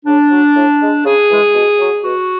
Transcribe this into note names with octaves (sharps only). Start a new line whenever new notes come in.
C#3 D4
F#3
A2
G#3
C#3 G#4
E3 G#3
B2
F#3
B2 F#4